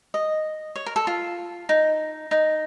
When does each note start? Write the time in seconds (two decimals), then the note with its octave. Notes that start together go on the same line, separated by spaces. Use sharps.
0.14 D#5
0.76 C#5
0.86 A#4
0.96 A4
1.07 F4
1.69 D#4
2.31 D#4